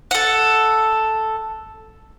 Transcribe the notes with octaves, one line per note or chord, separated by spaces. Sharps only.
A4 F#5